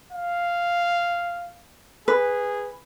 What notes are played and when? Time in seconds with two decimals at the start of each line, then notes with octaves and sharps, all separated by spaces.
0.12 F5
2.08 G#4 B4